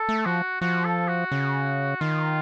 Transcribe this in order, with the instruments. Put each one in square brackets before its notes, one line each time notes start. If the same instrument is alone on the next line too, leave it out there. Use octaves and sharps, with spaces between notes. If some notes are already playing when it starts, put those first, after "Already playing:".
Already playing: [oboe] A4
[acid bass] A3
[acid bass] F3 [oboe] F#4
[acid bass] F3 [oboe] F#4
[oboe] A4
F#4
[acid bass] C#3
[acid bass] D#3 [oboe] F4